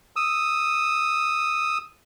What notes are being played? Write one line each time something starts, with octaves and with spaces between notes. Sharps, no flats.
D#6 E6